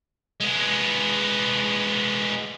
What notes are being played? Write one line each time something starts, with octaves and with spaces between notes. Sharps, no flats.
G#3 B3